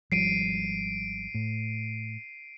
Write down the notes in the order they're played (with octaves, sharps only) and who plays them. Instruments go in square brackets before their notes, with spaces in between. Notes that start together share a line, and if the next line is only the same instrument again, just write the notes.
[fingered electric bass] G#1 F3 G3 [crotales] C7 D7 D#7
[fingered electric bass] A2